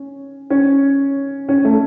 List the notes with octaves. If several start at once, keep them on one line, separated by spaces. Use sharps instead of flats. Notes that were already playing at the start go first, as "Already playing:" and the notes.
Already playing: C#4
C#4
C#4
A3